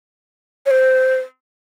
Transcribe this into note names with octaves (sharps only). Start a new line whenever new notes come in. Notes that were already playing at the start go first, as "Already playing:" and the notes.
C#5
C5